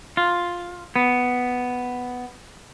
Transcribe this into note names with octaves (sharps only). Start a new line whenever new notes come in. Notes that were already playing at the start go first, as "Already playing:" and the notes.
F4
B3